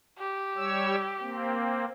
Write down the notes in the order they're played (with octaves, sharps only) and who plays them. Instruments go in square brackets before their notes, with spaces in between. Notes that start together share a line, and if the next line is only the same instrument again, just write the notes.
[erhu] G4
[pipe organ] G3 C#5 E6
A#3 C4